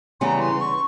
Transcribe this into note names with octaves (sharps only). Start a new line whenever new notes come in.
C#3 E3 G3 B3 A#5 C6
C6
C#6